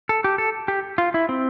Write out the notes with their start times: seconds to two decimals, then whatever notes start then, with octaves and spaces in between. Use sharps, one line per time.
0.09 A4
0.24 G4
0.38 A4
0.68 G4
0.98 F4
1.14 E4
1.29 C4